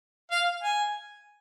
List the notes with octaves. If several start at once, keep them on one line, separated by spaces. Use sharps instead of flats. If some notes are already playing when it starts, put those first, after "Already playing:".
F5
G#5